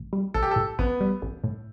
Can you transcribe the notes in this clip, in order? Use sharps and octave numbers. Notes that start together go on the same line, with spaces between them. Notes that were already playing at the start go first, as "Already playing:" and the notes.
Already playing: A1
G3
A1 A4
G4
A4
A2
A1 B3
G3
A1
A2